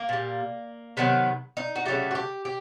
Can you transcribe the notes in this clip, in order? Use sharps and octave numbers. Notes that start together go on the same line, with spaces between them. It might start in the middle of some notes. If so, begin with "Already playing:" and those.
Already playing: A#3
A#2 G3
C3 D#3 F#3 B3
D#4
F#4
C#3 F#3 A3 G4
F#4
G4
G4